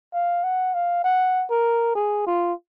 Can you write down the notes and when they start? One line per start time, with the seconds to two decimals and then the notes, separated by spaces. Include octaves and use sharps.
0.13 F5
0.44 F#5
0.74 F5
1.04 F#5
1.50 A#4
1.95 G#4
2.27 F4